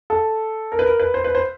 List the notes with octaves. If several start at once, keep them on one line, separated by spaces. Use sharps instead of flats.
A4
A#4
B4
A#4
B4
C5
B4
C5